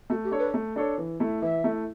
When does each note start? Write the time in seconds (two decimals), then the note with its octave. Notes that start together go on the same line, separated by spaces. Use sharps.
0.10 A3 F#4
0.24 G4
0.32 D4 A4 C#5
0.39 B4
0.54 A3
0.76 D4 A4 C#5
0.98 E3
1.20 A3 E4
1.41 E3 E5
1.64 A3 E4